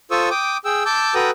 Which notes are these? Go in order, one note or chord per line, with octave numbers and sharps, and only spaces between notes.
F4 A4 C5 C#6 D#6 E6
G5 D6 D#6
G#4 G5 E6
A5 D6 E6 G6
F#4 A4 B4 G5 A#5 D#6